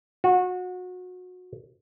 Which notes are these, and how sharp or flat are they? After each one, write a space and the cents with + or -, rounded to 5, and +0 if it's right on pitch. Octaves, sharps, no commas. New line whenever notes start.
F#4 -25